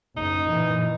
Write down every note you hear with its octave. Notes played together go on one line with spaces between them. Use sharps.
F#1 D#4
A#2 E3